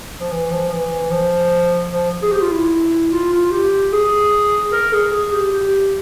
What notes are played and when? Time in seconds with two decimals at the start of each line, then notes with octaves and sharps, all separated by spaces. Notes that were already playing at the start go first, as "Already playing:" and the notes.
0.20 F3
0.31 E3
0.51 F3
0.71 E3
1.11 F3
1.91 F3
2.22 G#4
2.32 G4
2.42 F4
2.51 E4
3.11 F4
3.32 F4
3.51 G4
3.92 G#4
4.72 A#4
4.93 G#4
5.12 G#4
5.32 G4
5.52 G4